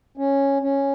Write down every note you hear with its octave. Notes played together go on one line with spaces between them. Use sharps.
C#4
C#4